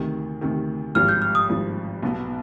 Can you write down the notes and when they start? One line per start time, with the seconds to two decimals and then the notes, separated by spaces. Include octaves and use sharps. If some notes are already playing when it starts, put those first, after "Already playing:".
Already playing: D2 C3 D#3
0.41 D2 C3 D#3
0.95 G#1 G2 F3 F6
1.09 G6
1.22 F6
1.35 D#6
1.49 G#1 G2 F3
2.02 B1 B2 B3